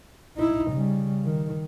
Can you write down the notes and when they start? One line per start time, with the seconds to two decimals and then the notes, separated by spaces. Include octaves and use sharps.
0.37 D#4 E4
0.71 C#3 G3
1.25 D#3